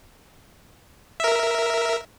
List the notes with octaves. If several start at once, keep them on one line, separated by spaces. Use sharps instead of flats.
A#4 E5